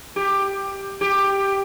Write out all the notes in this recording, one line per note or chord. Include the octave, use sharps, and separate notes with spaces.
G4
G4